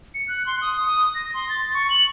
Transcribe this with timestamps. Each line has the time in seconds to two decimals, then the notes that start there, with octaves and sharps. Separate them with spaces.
0.14 C#7
0.28 F#6
0.46 C6
0.62 D#6
0.86 D#6
1.15 A#6
1.34 C6
1.49 A6
1.74 C#6
1.90 F#7